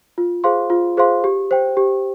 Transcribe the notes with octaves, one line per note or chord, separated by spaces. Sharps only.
F4
G#4 C5 F5 C6
F4
G#4 C5 F5 C6
G4
C5 G5
G4